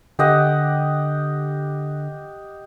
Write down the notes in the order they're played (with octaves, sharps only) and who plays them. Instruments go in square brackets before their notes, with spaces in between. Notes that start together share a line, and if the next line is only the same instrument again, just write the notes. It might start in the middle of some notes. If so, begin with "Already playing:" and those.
[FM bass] D3 [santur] G4 D#5 F#5